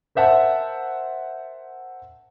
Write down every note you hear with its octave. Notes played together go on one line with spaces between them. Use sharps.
A#4 C5 E5 F#5 A5